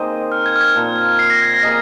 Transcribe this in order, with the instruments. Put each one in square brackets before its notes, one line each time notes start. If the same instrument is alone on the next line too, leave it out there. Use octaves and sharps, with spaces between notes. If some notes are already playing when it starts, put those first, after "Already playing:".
Already playing: [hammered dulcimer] D#3 A#3 C4 D#4 G#4 C5 D#5
[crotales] F6
G#6
F6
G#6
[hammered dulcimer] A#2 F3 A#3
[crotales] C7
A#6
G#6
A#6
[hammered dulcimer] A#3 G#4 D#5